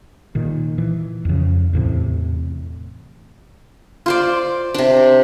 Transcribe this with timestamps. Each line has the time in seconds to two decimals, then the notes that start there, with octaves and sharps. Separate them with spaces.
0.35 A#2 D#3
0.78 E3
1.25 F2 C#3
1.73 E2 A2 C3
4.06 F4 C5 D5
4.74 C3 D4